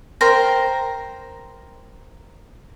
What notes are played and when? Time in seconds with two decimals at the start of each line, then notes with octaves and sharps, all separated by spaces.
0.21 A#4 C5 G5 A#5